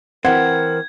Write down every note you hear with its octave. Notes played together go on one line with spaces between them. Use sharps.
E3 C4 A#4 F#5 G#6